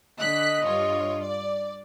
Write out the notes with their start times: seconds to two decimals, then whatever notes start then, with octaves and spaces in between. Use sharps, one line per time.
0.20 D3 D#5 F#6 B6
0.65 G2 F4 C#5
1.22 D5